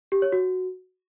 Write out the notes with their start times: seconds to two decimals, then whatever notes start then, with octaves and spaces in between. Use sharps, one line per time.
0.12 G4
0.22 C#5
0.32 F#4